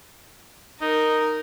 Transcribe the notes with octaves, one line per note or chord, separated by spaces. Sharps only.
D#4 A#4